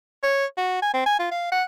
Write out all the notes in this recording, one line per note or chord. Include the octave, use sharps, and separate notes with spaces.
C#5
F#4
G#5
C4
G#5
F4
F5
F#5